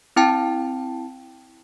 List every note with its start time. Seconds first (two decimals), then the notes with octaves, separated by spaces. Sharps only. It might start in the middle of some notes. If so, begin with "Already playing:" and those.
0.16 C4 E4 G5 A5